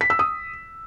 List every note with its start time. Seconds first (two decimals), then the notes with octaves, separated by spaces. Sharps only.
0.01 B6
0.10 E6
0.19 D#6